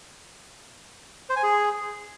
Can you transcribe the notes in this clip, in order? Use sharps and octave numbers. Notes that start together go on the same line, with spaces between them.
C5
G#5
G#4